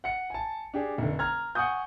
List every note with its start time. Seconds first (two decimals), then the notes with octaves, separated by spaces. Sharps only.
0.04 F#5 C#7
0.30 G#5 A5
0.74 D4 G4 G#4
0.98 F1 D3
1.19 A#5 F6 G#6
1.55 F#5 G#5 C#6 D#6 G6